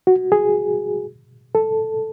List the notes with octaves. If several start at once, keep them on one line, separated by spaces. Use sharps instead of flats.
F#4
G#4
A4